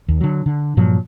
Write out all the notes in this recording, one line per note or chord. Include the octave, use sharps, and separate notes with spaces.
D#2
D3 F#3
D3
G2 A#2 F3 F#3